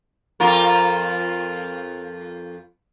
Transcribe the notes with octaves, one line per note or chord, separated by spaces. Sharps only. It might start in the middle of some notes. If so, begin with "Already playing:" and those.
F2 F4 A#4